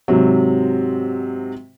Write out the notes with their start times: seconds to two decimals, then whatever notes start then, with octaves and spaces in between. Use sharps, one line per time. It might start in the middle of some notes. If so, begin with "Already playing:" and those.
0.08 G#2 C3 F#3